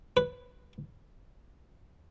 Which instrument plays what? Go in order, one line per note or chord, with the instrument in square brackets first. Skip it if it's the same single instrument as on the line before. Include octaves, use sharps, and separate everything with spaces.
[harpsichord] B4